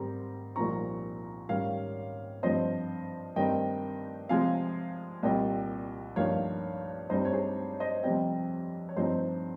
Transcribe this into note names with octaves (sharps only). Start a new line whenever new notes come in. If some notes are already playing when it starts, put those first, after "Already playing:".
Already playing: G#2 D#3 G3 C4 A#5
C2 A#2 F3 C4 D#4 A#5 C#6
G#2 D#3 G3 C#4 C#5 F5
G2 F3 C4 C5 D#5
G2 D#3 G3 C4 D#4 D#5 G5
C3 F3 G#3 C4 F5 G#5
C2 A#2 G3 D#5 G5
G2 F3 A#3 D#4 C#5 F5
G2 G3 C4 D#4 C5 D#5
C#5
G#4 C5
C5 D#5
F2 C3 G3 C4 D#5 G5
C#5
G2 F3 C4 D#4 C5 D#5